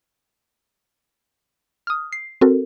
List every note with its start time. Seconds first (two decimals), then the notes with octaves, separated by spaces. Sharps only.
1.87 D#6 F6
2.13 C7
2.41 C4 F#4 A4 A#4